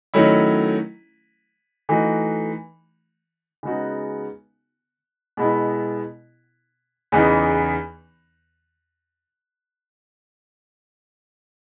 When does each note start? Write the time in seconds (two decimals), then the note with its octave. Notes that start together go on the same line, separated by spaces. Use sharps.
0.14 D#3 F#3 A3 C#4 E4
1.89 E3 A3 D#4 F#4
3.63 C#3 G#3 B3 D#4 F#4
5.37 B2 G#3 B3 E4
7.12 E2 C#3 E3 B3 D#4